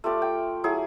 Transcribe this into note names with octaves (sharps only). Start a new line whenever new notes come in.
A3 F4 G4 D5
G5
F#3 E4 G#4